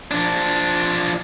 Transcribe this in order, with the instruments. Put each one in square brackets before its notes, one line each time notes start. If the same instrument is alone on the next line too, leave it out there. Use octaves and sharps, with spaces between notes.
[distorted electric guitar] F3 D4